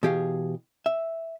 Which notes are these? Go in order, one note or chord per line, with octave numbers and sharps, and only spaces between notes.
B2 E3 G4 G#4 F5
E5